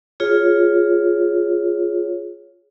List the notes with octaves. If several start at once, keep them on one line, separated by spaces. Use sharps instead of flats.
F4 G#4 C#5